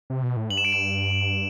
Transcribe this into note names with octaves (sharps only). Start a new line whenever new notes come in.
C3
B2
A2
G2 F#7
E7
D7
E7